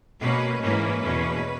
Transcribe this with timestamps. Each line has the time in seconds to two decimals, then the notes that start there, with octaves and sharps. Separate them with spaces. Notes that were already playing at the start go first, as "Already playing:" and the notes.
0.21 B2 A#3 C#4 B4
0.62 G#2 E3 A#3 C#4 B4
1.03 E2 B2 A#3 C#4